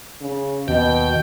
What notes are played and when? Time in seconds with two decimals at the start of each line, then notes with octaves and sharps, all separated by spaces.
0.21 C#3
0.68 D#2 B2 G5